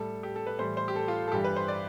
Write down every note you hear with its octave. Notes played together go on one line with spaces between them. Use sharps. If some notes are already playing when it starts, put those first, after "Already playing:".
Already playing: A2 G3 A4
G4
A4
B4
A2 E3 G3 C5
C5
G4
A4
F4
A4
G2 E3 G3 G4
B4
C5
D5